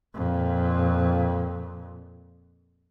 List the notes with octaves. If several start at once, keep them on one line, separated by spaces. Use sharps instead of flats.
F2 A#2